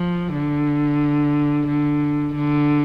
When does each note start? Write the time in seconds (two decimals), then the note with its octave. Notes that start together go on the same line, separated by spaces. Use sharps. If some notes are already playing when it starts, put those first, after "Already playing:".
Already playing: F3
0.35 D3
1.67 D3
2.35 D3